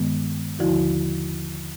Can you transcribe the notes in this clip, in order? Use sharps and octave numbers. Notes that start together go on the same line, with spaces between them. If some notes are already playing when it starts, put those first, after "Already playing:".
Already playing: G2 D#3 G#3 B3
D#2 D3 F3 E4 F#4